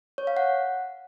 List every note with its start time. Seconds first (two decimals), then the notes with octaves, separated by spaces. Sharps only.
0.18 C#5
0.27 F5
0.37 F#5